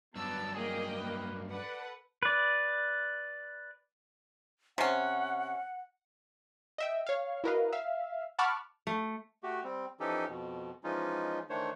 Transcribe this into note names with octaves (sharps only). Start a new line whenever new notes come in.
G2 F#3 B3 A5 D6 E6
A#3 G4 G#4 D#5 G5
B4
A4 B4 D5 F#5
B4 D5
C3 C#4 F#5
D#5 E5 G5
C#5 F5
E4 F#4 A#4 B4 D#5 F5
E5 F5
F#5 A5 B5 C#6 D6 F6
A3
A3 F#4 G4
G3 C4
E3 F3 C#4 D#4 G4 A4
F2 B2
E3 F3 G#3 C#4 D#4 F4
D#3 E3 A3 D4 C5 C#5